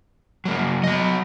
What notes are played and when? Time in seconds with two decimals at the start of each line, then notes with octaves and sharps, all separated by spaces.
0.45 F#3 A#3
0.84 F#3 D#5